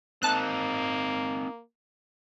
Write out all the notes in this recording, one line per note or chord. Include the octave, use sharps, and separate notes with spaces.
A#3 C4 D#4 A5 F#6